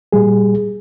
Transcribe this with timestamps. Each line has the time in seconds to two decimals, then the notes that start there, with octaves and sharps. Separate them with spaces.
0.12 A#2 G3 G#4